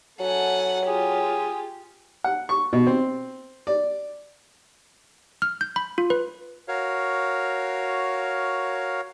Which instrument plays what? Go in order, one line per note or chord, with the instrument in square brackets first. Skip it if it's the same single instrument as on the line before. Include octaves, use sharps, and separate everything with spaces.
[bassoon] F#3 [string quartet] A4 F#5 G#5
[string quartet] F4 G4 [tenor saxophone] G#4
[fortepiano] F#5
C#6
B2
C4
D5
[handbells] F6
G6
B5
F4
B4
[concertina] F#4 A#4 C#5 F5